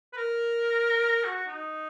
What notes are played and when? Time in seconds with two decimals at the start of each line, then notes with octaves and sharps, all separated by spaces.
0.13 B4
0.17 A#4
1.24 F#4
1.35 F#4
1.47 D#4